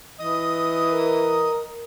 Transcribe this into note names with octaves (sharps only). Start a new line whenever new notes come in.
E3 D#5 D#6
A#4